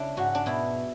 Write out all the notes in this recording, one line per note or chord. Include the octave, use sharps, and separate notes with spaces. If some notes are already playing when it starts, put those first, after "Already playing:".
Already playing: C#3 D4 E4
G#2 F#4
D4
B2 E4